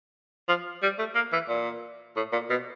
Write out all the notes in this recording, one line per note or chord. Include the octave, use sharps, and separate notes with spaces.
F3
G3
A3
A#3
E3
A#2
A2
A#2
B2